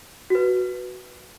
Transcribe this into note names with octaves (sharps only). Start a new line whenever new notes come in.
F#4 B4